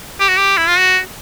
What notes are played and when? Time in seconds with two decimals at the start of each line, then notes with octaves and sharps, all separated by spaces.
0.20 G4
0.28 F#4
0.37 G4
0.57 E4
0.68 F4
0.79 F#4